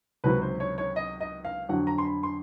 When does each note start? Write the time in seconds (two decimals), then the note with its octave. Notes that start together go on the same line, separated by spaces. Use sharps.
0.24 C#2 C3 D#3 F#3 B4
0.42 C5
0.60 C#5
0.78 C#5
0.96 D#5
1.21 D#5
1.45 F5
1.69 F2 D3 F#3 F#5
1.87 A#5
1.98 C6
2.05 B5
2.23 C6